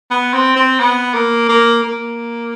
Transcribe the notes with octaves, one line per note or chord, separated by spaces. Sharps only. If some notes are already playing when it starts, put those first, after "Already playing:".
B3
C4
C4
B3
A#3
A#3
A#3